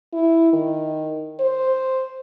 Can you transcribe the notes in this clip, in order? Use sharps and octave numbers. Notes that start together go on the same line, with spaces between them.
E4
D#3
C5